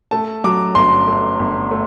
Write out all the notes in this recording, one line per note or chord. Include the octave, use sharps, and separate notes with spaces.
A3 A5
F#3 D6
G1 C6
A3
G1
A3